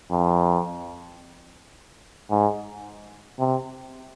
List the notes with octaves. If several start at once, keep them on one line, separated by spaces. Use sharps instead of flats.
F2
G#2
C3